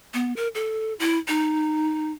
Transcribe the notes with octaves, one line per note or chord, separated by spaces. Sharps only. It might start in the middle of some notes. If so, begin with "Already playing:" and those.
B3
A#4
A4
E4
D#4